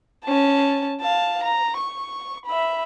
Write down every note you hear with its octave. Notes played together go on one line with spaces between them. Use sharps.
C#4 A5
F5 A5
A#5
C#6
E5 B5